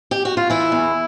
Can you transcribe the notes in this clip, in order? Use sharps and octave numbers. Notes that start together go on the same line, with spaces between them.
G4
F#4
F4
E3 E4
E2